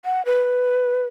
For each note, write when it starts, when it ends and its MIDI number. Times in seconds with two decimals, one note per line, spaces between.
0.05 0.22 78
0.26 1.06 71